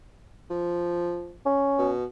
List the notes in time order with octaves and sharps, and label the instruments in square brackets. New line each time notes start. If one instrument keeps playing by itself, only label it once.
[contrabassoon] F3
[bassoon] C#4
[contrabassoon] B2